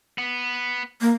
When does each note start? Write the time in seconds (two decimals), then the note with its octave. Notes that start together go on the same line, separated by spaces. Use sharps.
0.18 B3
1.01 A#3